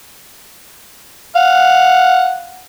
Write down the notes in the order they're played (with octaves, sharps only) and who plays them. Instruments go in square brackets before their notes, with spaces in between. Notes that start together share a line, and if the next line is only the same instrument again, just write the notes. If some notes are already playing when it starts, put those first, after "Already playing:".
[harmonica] F5 F#5